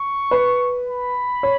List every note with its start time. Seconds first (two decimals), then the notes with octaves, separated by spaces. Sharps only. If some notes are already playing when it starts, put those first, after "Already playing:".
Already playing: C#6
0.31 B4
0.88 B5
1.43 C#5